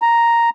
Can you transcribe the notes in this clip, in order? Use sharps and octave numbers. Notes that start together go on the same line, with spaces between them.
A#5